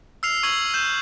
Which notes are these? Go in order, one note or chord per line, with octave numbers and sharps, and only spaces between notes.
E6 F6 C7 F7
C#6 E6 G#6 F#7
G6 E7